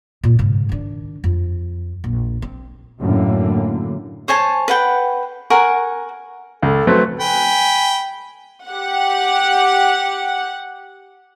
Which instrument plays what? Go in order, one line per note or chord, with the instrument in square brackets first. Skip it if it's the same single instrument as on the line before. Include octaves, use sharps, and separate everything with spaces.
[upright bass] A#2
G#2 C#3
D#3 D4
F2
A#1
C4
[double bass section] F#2 A2 D3 A#3
[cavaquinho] C5 C#5 G#5 A5
B4 F#5 G5
A#4 F#5 G#5 C#6
[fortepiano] C#2 [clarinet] A4
[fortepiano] F#3 A3 C4 [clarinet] B4
[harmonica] G5 G#5 B5
[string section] G4 F#5